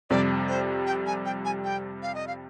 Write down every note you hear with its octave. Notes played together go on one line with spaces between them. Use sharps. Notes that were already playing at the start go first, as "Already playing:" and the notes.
F2 C3 G3 D5
C5
G5
G#5
G5
G#5
G5
F5
D#5
F5